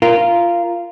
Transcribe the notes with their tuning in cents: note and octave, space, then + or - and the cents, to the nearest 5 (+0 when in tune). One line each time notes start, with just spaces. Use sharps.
F4 -15 A#4 +0